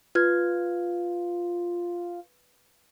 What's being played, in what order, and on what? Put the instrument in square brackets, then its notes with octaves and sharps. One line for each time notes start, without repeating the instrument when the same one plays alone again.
[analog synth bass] F4 [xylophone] B4 F6 G#6